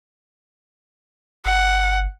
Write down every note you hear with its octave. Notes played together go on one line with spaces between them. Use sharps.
G1 F#5